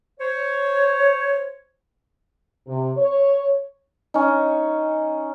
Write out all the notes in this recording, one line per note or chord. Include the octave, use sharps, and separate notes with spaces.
C5 C#5
C3
C#5
C#4 D#4